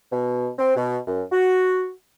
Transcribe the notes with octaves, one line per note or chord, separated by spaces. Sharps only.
B2
C4
B2
F#2
F#4